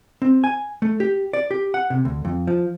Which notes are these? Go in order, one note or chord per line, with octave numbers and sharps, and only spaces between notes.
C4
G#5
A3
G4
D5
G4
F#5
C3
D2
F2
F3